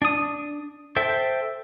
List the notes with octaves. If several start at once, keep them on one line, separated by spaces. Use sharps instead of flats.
D4 D#6
A4 C5 E5 G5